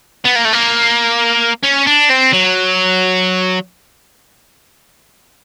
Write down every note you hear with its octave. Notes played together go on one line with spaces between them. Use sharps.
B3
A#3
A3
A#3
C#4
D4
C4
F#3